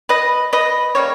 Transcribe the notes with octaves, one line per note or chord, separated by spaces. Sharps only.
B4 D#5
B4 D#5
C#3 G3 A#3 C#5